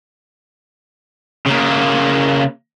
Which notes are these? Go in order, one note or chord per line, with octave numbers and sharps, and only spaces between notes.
C#3 A#3